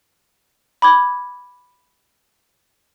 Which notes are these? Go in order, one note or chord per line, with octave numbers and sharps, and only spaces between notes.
B5 D6 G#6